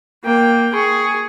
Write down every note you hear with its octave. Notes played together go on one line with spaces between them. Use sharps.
A#3 G5
G#4 C#6